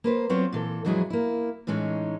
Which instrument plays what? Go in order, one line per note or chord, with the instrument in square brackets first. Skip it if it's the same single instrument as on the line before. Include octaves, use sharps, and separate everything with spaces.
[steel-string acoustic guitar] A#3 B4 C5
F#3 B3 C4 F4 C#5
A#2 E3 A4
F2 E3 F#3 G#3 E4 G#4
A#3 E4
A2 E3 G#3 C#4 D#4